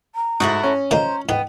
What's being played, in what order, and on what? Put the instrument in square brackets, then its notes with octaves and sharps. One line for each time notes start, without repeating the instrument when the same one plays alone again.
[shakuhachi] A#5
[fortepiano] G#2 [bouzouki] A3 E4 F#4
[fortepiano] C#4
[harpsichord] A#2 D#3 G#3 [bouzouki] C5 [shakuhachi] A#5
[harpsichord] G#2 [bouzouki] B3 [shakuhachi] G5